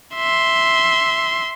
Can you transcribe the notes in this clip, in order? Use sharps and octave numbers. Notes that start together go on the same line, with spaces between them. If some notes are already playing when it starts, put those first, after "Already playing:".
E5 C6